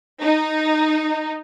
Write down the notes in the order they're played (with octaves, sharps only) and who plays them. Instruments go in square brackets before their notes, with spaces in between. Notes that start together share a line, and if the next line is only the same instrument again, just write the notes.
[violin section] D#4